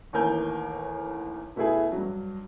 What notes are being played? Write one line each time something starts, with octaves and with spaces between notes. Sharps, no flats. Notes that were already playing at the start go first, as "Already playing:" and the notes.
A1 D#2 E3 A#4 G#5 G6
B2 A3 B3 E4 G#4
G2 F#3